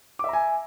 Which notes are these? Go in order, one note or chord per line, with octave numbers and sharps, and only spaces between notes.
E5 G#5 A#5 D6